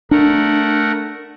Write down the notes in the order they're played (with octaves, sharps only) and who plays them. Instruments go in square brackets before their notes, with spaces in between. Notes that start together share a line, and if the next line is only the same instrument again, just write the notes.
[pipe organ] A3 A#4 F#5 [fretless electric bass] D4